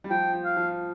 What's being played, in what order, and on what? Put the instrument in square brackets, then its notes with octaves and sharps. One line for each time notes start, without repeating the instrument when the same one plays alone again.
[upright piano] G3
[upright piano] F3 [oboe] G5
[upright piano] F3
[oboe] F5
[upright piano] F3